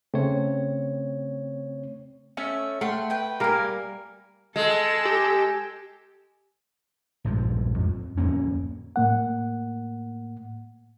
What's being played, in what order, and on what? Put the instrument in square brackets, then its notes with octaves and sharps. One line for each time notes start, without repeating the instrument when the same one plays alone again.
[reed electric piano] C#3 A3 [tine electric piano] C4 C#5
[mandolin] A3 C#4 E5
[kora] A3 [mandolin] F#5 G5 C6
[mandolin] B4 G5
[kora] G3 A#4 [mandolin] A#3 G#5
[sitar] G#3 [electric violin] A4 E6
[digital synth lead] G4
[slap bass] A#1 G2 F3 G#3
F2
D1 F2 A#3 C#4
[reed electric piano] A2 A#3 F#5